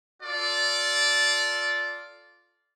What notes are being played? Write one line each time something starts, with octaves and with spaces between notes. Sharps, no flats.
F4 A4 D5